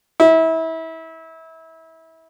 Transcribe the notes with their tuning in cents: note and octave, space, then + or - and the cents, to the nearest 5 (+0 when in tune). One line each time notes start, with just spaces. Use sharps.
E4 -25